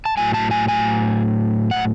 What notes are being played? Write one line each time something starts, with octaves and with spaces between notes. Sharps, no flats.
A5
A2 F#3 A3 G#5
A5
G#5
G#5
F#5